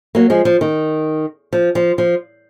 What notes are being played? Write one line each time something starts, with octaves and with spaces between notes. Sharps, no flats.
F#3 A#3
F3 G#3
F3
D#3
F3
F3
F3